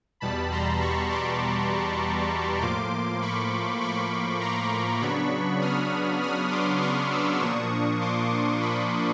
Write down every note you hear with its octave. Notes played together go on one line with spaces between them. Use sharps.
E2 B2 G3 A5 B5
A#5 C6
B5 C#6
C6 D6
A2 F3 A#3 C6 D6
B5 C#6
B5 C#6
A#5 C6
C#3 F#3 B3 D4 B5 C#6
D#6 F6
D#6 F6
C6 D6
C#6 D#6
D6 E6
A#2 F3 A#3 D4 C#6 D#6
C6 D6
B5 C#6